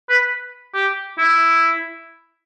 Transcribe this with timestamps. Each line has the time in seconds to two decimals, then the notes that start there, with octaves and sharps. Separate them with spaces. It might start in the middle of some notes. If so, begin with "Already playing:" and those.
0.09 B4
0.74 G4
1.18 E4